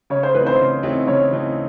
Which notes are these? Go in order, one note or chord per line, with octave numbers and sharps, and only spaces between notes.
C#3 C#5
C5
E3 A3 C4 D#4 B4
C5
C#3
E3 A3 C4 D#4
C#3 C#5
E3 A3 C4 D#4